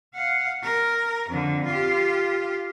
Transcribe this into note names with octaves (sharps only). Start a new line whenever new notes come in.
F5 F#5
A#4
F2 D3
F4 G4